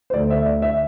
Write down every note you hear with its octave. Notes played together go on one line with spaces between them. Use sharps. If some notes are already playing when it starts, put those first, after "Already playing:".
C5
D2 D3 A3 D5
E5
D5
E5